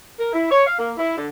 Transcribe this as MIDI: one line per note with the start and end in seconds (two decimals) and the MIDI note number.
0.18 0.31 70
0.32 0.50 64
0.51 0.64 73
0.66 0.73 77
0.78 0.91 58
0.97 1.16 64
1.16 1.26 50